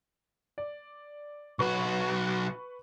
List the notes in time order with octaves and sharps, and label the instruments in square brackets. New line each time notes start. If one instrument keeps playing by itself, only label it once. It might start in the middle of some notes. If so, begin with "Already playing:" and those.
[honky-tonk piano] D5
[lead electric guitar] B1 F#4 [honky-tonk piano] B4 C#6